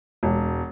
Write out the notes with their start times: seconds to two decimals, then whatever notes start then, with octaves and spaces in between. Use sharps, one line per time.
0.23 E1